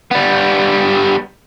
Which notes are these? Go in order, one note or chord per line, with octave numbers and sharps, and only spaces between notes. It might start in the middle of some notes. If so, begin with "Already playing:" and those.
G3 B3